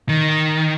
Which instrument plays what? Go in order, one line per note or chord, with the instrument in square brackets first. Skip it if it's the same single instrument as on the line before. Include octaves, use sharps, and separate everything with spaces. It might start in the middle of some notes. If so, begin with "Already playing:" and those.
[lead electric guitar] D#3